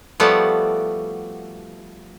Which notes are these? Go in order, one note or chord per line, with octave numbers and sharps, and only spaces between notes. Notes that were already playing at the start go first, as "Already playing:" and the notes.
F3 G3 A3 B3 F#4